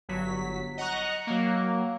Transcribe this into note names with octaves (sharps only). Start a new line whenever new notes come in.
G1 F#3 B6
D#5 F#5 A#5 C#6 F#6
F#3 A#3